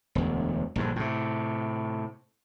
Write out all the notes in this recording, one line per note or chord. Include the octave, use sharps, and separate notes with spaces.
E1 D2
A#1 G2 D3
A2 C3